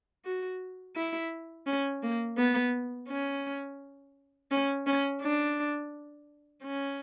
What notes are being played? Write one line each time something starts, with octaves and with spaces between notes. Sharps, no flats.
F#4
E4
C#4
A#3
B3
C#4
C#4
C#4
D4
C#4